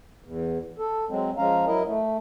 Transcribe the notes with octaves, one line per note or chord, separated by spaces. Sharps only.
E2
A4
F#3 G#3 C4
F3 G#3 C#4 F5 A#5
F#3 E4 A#4 D#5
A3